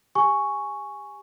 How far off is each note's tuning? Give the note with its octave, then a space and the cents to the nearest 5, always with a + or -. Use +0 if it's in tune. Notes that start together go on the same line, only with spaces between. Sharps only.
G4 +20 G#5 +0 C#6 +0